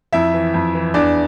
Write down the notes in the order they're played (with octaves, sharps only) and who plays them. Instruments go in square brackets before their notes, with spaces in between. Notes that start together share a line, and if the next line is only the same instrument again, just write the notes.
[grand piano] F2 E4 E5
E3
F2
E3
E2 D4 D5